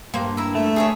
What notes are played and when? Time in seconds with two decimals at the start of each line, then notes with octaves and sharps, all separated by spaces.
0.14 G2 A#3 C5
0.37 E4 A#5 E6
0.55 A3 E5
0.76 G#4 A4 C#5